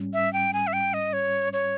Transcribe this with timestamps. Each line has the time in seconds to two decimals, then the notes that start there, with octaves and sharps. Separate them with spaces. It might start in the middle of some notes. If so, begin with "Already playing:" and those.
Already playing: G#2 G3 C#4
0.14 E5
0.33 G5
0.53 G#5
0.67 E5
0.73 G5
0.94 D#5
1.13 C#5
1.53 C#5